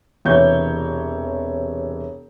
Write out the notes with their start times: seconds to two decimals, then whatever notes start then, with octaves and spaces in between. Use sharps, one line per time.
0.25 E1 C3 E3 C#5 G6